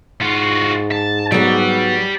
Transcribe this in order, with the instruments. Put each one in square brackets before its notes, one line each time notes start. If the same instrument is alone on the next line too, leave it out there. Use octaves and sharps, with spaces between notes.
[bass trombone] G#2 [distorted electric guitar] F4 F#4
[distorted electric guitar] A5
[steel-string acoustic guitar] F#3 B3 [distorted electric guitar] G4 D5